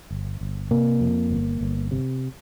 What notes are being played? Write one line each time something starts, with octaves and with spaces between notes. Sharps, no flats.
G1
G1
C3 A#3
F2
G1
G1
C3